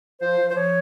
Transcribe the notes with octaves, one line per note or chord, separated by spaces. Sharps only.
F3 C5
F3
C5
F3 C#5